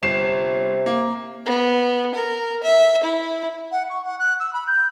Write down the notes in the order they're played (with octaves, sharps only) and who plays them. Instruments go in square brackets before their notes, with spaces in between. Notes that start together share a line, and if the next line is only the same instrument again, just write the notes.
[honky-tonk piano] G1 C7 E7 [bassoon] C3
[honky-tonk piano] A#3
[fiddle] B3
A#4
E5
E4
[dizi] F#5
C#6
F#5
F#6
E6
B5
G6